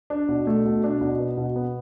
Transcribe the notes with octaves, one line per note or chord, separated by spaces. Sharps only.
D4
B2
A3
B2
D4
B2
B3
B2
B3